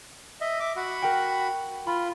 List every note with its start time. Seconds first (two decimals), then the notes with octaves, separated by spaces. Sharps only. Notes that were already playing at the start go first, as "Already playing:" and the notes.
0.41 D#5 E5
0.60 E5 D6
0.77 F#4 F#5 B5
1.02 A#4 G5
1.87 F4 B5